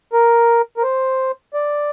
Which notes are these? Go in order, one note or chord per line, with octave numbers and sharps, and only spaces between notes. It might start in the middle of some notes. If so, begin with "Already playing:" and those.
A#4
A#4
C5
D5